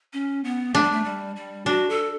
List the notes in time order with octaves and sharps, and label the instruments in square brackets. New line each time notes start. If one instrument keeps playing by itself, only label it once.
[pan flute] C#4
B3
[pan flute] A3 [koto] D4
[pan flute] G3
A3
G3
G3
[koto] D4 [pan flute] F#4
[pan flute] A4